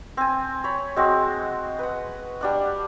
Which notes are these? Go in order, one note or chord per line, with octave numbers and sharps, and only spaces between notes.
C4 G#5
C#5 B5
G#3 C4 F#4
B4 F#5
G3 D4 F#5